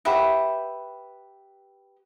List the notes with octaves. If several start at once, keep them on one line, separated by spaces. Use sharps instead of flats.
G4 B4 E5 F#5